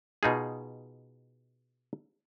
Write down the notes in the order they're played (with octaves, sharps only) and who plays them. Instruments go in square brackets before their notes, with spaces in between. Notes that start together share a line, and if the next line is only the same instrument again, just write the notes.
[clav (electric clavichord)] B2 D#4 F4 G#4